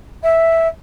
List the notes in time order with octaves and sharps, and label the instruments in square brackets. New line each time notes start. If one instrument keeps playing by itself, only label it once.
[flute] E5